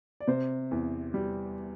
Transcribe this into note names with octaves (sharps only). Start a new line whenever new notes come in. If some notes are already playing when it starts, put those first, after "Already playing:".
D5
C3 C5
E2
G3